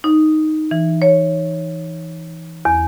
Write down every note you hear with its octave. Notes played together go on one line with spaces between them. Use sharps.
D#4
E3
C#5
E2